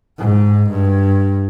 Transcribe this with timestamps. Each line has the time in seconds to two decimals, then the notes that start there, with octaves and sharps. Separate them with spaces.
0.18 G#2
0.70 G2